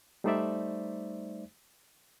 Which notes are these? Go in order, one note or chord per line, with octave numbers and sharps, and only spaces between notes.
G3 A3 D#4 C5 D5 E5